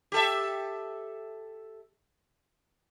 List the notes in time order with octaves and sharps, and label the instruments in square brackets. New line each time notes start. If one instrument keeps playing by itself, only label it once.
[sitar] G4 A4 E5